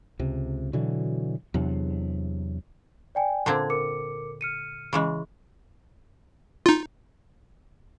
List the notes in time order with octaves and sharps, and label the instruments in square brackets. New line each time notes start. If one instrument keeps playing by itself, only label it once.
[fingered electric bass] C#2 C3
B2 D3 E3 F#3
E2 C3 F#3 D4
[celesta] D5 G5 G#5
[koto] A#2 D3 C4 [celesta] A5 G#6
[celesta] A#4 D6 C#7
F6 C#7 D#7
[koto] C#3 E3 G#3
[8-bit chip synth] D#4 F4